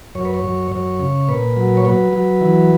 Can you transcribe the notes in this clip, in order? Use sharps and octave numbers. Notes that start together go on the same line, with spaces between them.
F#2 C#5
B4
C#5
F#2
F#2 C#5
C#3
A#2 B4
F#3
C#5
F#3 B4
F#3
E3